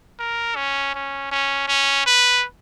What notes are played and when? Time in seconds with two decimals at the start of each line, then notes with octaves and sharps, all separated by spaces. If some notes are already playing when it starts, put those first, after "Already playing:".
0.19 A#4
0.56 C#4
0.94 C#4
1.31 C#4
1.68 C#4
2.06 B4